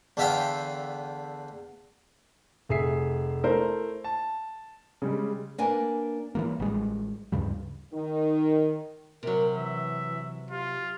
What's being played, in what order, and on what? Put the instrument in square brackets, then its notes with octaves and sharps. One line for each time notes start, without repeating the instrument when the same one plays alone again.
[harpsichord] E2 D3 E5 F5 G5
[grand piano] F1 G#4 E5 C7
A3 E4 A#4 C5
A5
C#3 G3 G#3
[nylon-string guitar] A#3 D4 B4 G#5
[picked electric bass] E3 F#3 A#3
A1 G3 G#3
D2 G2 C#3 G3
[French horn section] D#3
[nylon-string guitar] C3 F#3 [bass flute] A#4
[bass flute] E3 [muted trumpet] E5
[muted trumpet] F4 [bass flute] G4